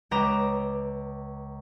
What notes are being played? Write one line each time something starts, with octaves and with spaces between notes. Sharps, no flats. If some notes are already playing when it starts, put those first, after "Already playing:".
C#2 B4 G5 A#5 D6 E7